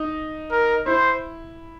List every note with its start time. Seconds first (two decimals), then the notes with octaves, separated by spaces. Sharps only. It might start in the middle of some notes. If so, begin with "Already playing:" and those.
Already playing: D#4
0.52 A#4
0.86 E4 C5